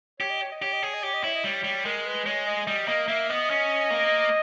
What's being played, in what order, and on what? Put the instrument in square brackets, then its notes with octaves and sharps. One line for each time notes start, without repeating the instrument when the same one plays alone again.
[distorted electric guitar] G4 [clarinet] C#5
[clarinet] D#5
C#5
D#5
[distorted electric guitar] G4 [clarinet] C#5
[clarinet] D#5
[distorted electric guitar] G#4 [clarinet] C#5
[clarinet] D#5
[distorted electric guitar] G4 [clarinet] C#5
[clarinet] D#5
[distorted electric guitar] E4 [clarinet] C#5
[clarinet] D#5
[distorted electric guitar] G3 [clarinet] C#5
[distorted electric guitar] G3
[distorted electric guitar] G#3 [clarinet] A#4
[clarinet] B4
[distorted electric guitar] G#3 [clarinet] C#5
[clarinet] D#5
[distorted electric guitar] G3 [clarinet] D#5
[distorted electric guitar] A#3 [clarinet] D#5
[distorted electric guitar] A#3 [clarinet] E5
[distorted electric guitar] B3 [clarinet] D#5
[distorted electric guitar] C#4
A#3